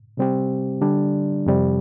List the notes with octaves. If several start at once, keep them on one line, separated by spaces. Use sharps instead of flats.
C3 G3 C4 G4
D3 G3 D4
F2 C3 G3